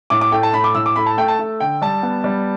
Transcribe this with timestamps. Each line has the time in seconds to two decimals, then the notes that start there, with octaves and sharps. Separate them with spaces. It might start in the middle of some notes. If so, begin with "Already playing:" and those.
0.10 A2 D6
0.21 D6
0.32 A3 G5
0.43 A5
0.54 A2 B5
0.64 D6
0.75 A2 E6
0.86 D6
0.96 A3 B5
1.06 A5
1.17 A3 G5
1.28 A5
1.39 A3
1.60 D3 G5
1.82 G3 A5
2.03 B3
2.24 G3